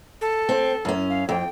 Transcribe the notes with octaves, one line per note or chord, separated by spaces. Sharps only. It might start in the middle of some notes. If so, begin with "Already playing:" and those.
A4
C4
F#2 C#4
F5
F2 G5